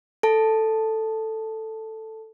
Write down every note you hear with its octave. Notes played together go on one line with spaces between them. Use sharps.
A4 A5